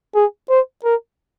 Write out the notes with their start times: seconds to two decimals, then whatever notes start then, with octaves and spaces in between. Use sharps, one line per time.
0.15 G#4
0.49 C5
0.84 A#4